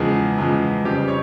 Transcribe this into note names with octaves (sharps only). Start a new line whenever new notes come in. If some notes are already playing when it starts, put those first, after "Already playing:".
Already playing: E2 C#3 F3 G#3 G#4
E2 C#3 F3 G#3
F2 C#3 G3 C4 G4
C#5